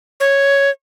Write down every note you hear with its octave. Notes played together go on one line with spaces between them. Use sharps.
C#5